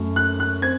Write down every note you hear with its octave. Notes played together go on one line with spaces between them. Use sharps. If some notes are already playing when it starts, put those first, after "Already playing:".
Already playing: F#2 A3
F#6
F#6
C4 G#6